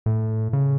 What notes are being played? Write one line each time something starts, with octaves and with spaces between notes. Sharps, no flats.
A2
C#3